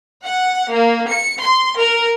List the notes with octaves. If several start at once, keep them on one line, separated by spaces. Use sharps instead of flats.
F#5
A#3
C#7
C6
A#4